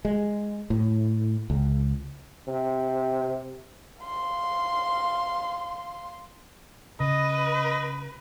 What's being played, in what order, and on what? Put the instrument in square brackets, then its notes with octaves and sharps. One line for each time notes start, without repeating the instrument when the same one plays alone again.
[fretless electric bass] G#3
A2
C#2
[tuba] C3
[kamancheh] F5 C6
[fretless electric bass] C#3 [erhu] B4 [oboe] D#5